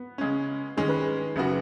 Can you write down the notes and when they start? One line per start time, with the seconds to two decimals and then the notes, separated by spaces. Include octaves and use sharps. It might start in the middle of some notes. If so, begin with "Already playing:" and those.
Already playing: B3
0.18 C#3 G#3 C#4
0.77 D#3 G#3 C#4 G#4
0.88 B4
1.00 G#4
1.36 F#1 C#3 B3 F#4